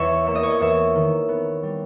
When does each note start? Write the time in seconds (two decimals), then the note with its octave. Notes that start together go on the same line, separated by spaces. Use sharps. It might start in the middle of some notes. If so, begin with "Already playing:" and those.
Already playing: E2 C#5 E5
0.27 A#3 E5
0.35 D#5
0.43 C#5
0.50 D#5
0.60 E2 C#5 E5
0.95 D#3
1.28 B3
1.63 G3